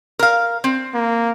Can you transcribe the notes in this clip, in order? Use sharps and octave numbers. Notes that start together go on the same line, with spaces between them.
A#4 F5
C4
A#3